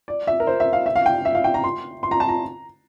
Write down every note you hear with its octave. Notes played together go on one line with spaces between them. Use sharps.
D5
E5
A#4
C5
E5
F5
E5
F5
G5
E5
F5
G5
A#5
C6
C6
A#5
A5
A#5